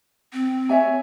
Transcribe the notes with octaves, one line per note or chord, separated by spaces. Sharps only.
C4
C#5 E5 G#5